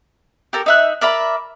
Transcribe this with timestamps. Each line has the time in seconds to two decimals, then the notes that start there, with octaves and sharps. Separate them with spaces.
0.53 G4 A4 A#4
0.66 D#4 E5 F#6
1.01 A#4 D5 E5 B5